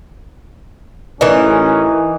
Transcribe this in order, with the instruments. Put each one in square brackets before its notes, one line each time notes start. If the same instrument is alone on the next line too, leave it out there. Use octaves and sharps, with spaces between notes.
[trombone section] A1 A#4 [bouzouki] E3 D#4 [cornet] C#4